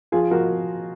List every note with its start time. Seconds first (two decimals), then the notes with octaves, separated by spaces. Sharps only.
0.12 F3 F4 G#4
0.31 F3 F#4 A#4